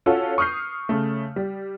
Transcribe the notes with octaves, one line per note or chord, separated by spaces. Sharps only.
C#4 F4 F#4 A4 F5
C#6 D#6 F6 G6 C7
C#3 A3
G3